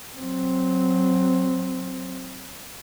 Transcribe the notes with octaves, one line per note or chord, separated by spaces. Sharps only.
F#3 C4